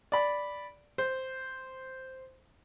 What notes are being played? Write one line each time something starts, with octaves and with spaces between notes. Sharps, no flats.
D5 B5
C5